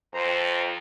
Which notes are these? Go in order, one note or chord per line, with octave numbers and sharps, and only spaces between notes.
F2 C5 A#5